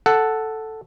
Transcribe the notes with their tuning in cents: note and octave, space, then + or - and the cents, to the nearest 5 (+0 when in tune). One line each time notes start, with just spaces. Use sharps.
A4 +0 F#5 +0